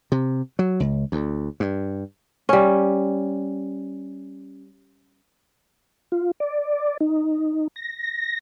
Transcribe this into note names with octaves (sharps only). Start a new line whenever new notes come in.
C3
F#3
C#2
D2
G2
G3 C#4
F4
D5
D#4
A#6